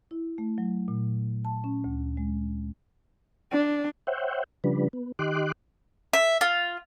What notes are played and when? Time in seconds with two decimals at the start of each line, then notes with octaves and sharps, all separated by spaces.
0.11 E4
0.38 A3
0.58 F#3
0.88 A#2
1.45 A5
1.64 C#4
1.84 D2
2.17 G#3
3.52 D4
4.07 C5 C#5 E5 F#5 G5
4.64 C#3 F3 G3 D4 B4
4.93 B3
5.19 D#3 G4 D#5 C6 D6 F#6
6.13 E5
6.41 F4